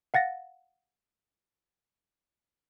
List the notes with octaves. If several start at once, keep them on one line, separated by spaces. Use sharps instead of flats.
F5 F#5 A6 A#6